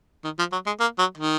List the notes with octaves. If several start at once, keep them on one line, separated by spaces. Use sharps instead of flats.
D#3
F3
F#3
G#3
A#3
F#3
D#3